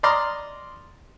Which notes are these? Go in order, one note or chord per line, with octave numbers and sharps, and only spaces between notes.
D5 D#5 A#5 C6 D6 F6